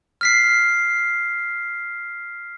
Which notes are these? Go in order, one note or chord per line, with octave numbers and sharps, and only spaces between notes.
F6 B6 C7